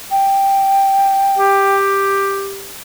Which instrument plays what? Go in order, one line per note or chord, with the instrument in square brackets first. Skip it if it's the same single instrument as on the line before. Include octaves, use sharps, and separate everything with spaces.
[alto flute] G5
[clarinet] G4